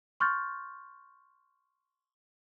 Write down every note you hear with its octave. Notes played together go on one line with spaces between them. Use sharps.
C6 C#6 F6 G6 A6